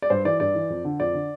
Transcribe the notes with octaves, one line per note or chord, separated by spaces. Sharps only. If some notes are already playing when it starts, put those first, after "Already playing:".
D5
G2 C5
E3 D5
G2 D5
E3
F2
D3
F2 D5
D3